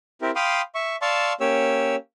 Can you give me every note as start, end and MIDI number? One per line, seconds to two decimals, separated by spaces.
0.22 0.31 60
0.22 0.31 64
0.22 0.31 67
0.22 0.31 70
0.36 0.61 77
0.36 0.61 79
0.36 0.61 83
0.36 0.61 84
0.36 0.61 86
0.36 0.61 87
0.75 0.96 76
0.75 0.96 85
1.02 1.33 74
1.02 1.33 77
1.02 1.33 81
1.02 1.33 84
1.02 1.33 85
1.02 1.33 88
1.40 1.96 58
1.40 1.96 61
1.40 1.96 67
1.40 1.96 73
1.40 1.96 88